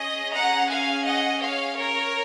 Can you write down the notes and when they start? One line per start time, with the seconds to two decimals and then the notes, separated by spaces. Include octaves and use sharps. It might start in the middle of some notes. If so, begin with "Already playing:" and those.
Already playing: C#4 G#4 D#5
0.32 F#5 A#5
0.68 F5 G#5
1.04 D#5 F#5
1.40 C#5 F5
1.76 A#4 C#5